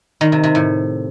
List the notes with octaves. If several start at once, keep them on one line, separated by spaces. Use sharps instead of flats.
D#3
C3
C3
A2